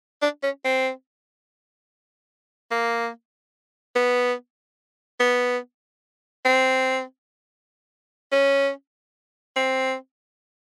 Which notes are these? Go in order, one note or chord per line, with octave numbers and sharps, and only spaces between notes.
D4
C#4
C4
A#3
B3
B3
C4
C#4
C4